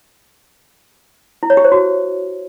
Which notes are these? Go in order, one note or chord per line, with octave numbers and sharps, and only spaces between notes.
E4
C#5
G4
C5
F#4